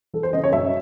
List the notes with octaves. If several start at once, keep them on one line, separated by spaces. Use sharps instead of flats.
E3 A4
C5
C#3 D#5
C#5
F#2 E5